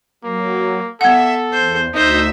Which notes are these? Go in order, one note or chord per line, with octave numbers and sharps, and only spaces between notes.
F#3 A#3
B3 A4 E5 F#5
E2 C5
D2 D#4 C5 E5